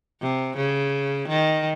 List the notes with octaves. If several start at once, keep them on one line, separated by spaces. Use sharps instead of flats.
C3
C#3
D#3